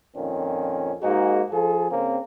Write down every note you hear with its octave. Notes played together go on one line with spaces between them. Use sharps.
F2 A#2 D#3 C4 C#4
G#2 A#3 D#4 F#4 G#4
F3 G#4 A4
C#3 A#3 C4